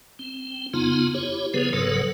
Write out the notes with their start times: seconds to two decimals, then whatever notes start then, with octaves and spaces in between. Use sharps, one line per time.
0.19 C4
0.74 F2 C#3 B3 D#4 F4
1.14 E4 G4 C#5
1.54 C#3 F3 B3 G#4 B4
1.73 F#1 G#2 C#3 F#3 A4 B4